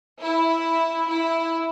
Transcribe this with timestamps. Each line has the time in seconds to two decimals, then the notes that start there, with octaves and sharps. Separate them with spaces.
0.21 E4
1.08 E4